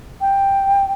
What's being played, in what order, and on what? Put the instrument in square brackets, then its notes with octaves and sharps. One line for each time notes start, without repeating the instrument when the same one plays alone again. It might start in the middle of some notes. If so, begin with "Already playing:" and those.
[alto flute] G5